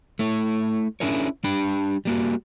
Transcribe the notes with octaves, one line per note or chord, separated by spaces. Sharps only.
A3 E4 C#5
C#4 D4 E4 G#4 A#4 C#5
G3 D4 G5 B5
G3 A#3 F#4